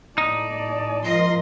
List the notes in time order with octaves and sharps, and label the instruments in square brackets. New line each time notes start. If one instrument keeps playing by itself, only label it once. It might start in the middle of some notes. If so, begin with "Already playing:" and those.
[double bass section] A2 [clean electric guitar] D#4 [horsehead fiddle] D5 A5
[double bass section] G#2 F3 [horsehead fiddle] F4 A#4 [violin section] D#5 C6